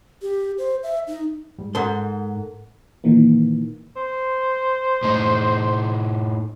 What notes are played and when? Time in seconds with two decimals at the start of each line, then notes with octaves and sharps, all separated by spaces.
0.22 G4
0.58 C5
0.83 E5
1.07 D#4
1.58 G#2 G3
1.75 G#2 A4 A#4 F#5 C6
3.04 A#2 D#3 E3 A#3
3.97 C5
5.03 A2 D#4